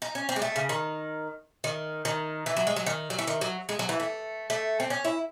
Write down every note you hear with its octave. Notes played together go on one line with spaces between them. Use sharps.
D#4
C#4
C4
G#3
A3
C#3
D#3
D#3
D#3
E3
F#3
G#3
F#3
D#3
F#3
E3
D#3
F#3
G#3
F#3
E3
A3
A3
C4
C#4
E4